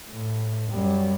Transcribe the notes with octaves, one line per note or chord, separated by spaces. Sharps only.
A2
F#2 G3